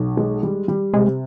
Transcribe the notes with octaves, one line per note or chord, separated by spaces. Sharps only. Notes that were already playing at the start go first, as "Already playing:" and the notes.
Already playing: B1
G#3
G3
G3
C3 G#3